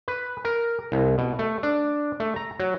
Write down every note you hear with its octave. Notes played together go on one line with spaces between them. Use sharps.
B4
A#4
C2
B2
A3
D4
A3
A#5
F#3